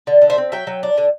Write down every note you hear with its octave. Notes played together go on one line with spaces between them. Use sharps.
D3
D3
C5 E5
C4
F#3 E5 G5
F#3
D4
D3